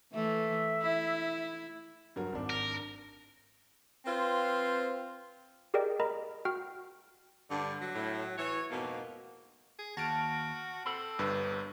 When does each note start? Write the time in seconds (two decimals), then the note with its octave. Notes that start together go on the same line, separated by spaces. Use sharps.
0.13 E3 A3 E5
0.83 E4
2.16 G2 F#3 A#4
2.32 G#1 D4
2.50 A#4
4.06 C4 F4 B4 C5
5.74 G4 G#4 A#4 D5 D#5 G5
6.00 A#4 D#5 A#5 B5
6.45 F#4 G5 F6
7.50 G2 D3
7.81 F#3
7.95 A2
8.38 E3 C#5
8.71 F2 G#2 B2 A#3
9.79 G#4
9.97 D#2 F#4 A5 F6 D7
10.85 C4 A4 B5
11.19 G1 G2 B4